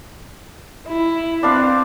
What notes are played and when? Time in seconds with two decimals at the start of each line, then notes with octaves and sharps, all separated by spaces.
0.88 E4
1.43 C4 D4 B4 F5